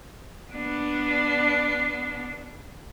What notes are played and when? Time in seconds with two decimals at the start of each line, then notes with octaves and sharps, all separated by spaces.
0.52 B3 D4